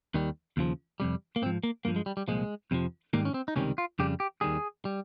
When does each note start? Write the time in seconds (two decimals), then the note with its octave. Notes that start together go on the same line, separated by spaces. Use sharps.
0.14 D#2 D#3 G3
0.57 D#2 C#3 F3
1.00 F2 C3 G3
1.36 A#3
1.42 G#2 C4
1.46 F3
1.63 A#3
1.85 G2 F3 A#3
1.96 G#3
2.06 G3
2.17 G3
2.28 C2 A#2 F3 G#3
2.71 F2 C3 F3
3.13 G#2 D#3 G3 A#3
3.25 C#4
3.34 C4
3.48 D#4
3.56 C#2 C3 D#3 G3 C#4
3.78 F4
3.99 F2 C#3 G3 G4
4.20 G4
4.41 D#2 D#3 G3 G#4
4.85 G3